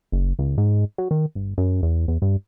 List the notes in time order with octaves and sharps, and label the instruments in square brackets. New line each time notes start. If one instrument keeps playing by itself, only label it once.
[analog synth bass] F#1
C#2
G#2
F#3
D#3
G1
F#2
E2
E2
G2